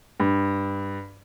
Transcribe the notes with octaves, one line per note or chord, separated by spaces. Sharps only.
G2